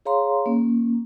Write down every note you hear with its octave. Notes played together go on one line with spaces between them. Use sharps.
G#4 C#5 F5 A#5 C6
A#3 C#4